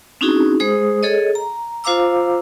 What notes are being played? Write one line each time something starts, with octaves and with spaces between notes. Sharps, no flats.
C4 C#4 D#4 E4 F#4 G#4
G#3 G#4 C5 D#6
G#4 A4 C#5 D#5
A#5
F4 C5 F5 A#5 D6 E6